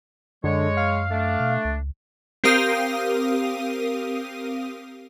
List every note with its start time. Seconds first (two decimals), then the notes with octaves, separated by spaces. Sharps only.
0.44 F#2 D3 G#3 C#5
0.77 F5
1.11 A3 D4
1.40 B2
1.65 C#2
2.44 C4 G4 A#4 F5 D#6 D#7